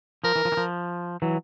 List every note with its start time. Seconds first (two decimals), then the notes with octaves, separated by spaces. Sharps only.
0.24 F3 A#4
0.36 E3
0.45 F3
0.52 E3
0.57 F3
1.22 E3 F#3